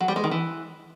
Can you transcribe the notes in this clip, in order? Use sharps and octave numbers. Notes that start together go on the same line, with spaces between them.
F#3
G3
G#3
D#3
E3